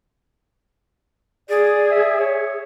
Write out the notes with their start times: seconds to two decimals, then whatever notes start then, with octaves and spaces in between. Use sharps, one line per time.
1.49 G#4 D5
1.91 E5
2.19 C#5